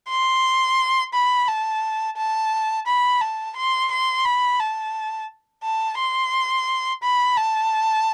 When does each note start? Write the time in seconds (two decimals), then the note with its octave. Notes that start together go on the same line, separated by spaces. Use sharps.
0.09 C6
1.13 B5
1.48 A5
2.17 A5
2.87 B5
3.21 A5
3.56 C6
3.91 C6
4.25 B5
4.59 A5
5.63 A5
5.98 C6
7.03 B5
7.37 A5